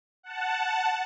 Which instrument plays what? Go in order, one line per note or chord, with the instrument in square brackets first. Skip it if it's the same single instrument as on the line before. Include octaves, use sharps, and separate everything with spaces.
[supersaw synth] F#5 A5